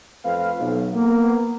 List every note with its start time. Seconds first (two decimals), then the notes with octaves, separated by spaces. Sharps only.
0.24 F2 A3 C4 B4 F5
0.60 B1
0.94 A#3 B3